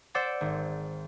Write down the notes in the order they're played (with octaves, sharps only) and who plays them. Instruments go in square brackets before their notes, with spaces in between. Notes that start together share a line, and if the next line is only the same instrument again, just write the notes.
[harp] C5 D5 F#5 D6 E6 A6
G#1